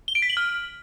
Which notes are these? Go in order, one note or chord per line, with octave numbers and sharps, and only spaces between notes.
G7
D7
B6
F#7
F6